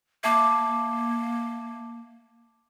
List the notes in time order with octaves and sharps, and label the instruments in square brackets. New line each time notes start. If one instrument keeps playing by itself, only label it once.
[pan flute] A#3 [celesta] E5 A5 D6